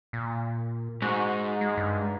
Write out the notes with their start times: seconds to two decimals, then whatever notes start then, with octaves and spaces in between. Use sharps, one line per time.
0.13 A#2
1.02 G#2 F#4
1.61 G#3
1.77 G2